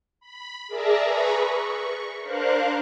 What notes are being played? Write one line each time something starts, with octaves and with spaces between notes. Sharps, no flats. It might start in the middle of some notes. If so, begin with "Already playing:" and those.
B5
G#4 A#4 D5 E5 A5 A#5
G#4 B4 A#5 B5 C#6
C#6
D4 A#4 C5 F5 F#6